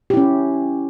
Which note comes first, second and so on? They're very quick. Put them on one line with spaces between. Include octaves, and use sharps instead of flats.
G4 E4 C#4